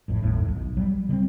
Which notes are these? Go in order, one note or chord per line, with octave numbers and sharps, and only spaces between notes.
A1 F2 A2
G1 D#2 A2
B1
F#3 G3
C#3 G3 A#3 C4